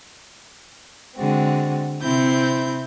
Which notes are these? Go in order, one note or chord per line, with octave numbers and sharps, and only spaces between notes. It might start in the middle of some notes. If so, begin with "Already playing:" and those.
D3 G#3 C4 F#4
C3 C4 E4 G6